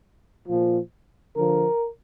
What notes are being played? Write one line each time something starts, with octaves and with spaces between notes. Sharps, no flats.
A#2 F3
D3 F3 A#4